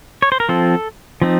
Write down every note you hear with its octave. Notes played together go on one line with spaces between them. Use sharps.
C#5
C5
A#4
F3 C4 F4 A4
F3 C4 D#4